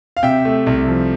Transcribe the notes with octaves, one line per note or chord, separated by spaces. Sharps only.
F5
C3 E5 G5
A3
C2
F3